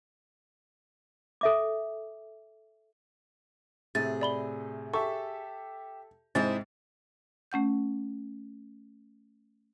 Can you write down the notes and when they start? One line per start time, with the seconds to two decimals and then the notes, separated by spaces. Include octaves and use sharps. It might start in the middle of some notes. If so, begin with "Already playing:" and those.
1.41 A4 E5 D6
3.95 A2 C3 G#4 A6
4.21 D5 B5 G7
4.93 G4 A4 E5 C#6
6.35 G#2 C3 G#3 E4 C5 D#5 A6
7.52 A3 C#4 F#5 G6